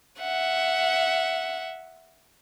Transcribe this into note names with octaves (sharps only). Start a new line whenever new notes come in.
E5 F#5